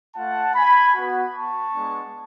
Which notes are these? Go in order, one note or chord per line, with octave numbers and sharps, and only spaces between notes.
A3 F4 F#5 A5
G#5 B5
B3 F#4
A5 C#6
G#3 B3 D4